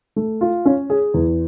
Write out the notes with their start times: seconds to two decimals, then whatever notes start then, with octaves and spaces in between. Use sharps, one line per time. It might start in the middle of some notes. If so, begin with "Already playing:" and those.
0.16 A3
0.41 F4
0.65 C#4
0.90 G#4
1.14 E2